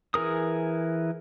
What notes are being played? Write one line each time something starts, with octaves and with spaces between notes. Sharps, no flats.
E3 G#4 A#4 D#6